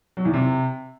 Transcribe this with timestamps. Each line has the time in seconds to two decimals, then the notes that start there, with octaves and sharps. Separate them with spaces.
0.17 F#3
0.25 E2
0.34 C3